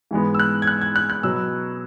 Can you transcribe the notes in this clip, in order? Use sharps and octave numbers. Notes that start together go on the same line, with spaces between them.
G#2 E3 G#3 B3
E6
F#6
G#6
F#6
G#6
F#6
F#6
B2 F#3 B3 E6